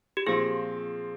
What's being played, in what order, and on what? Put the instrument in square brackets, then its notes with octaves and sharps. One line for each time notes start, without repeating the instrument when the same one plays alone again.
[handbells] G4
[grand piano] A#2 F3 C4 [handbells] G#4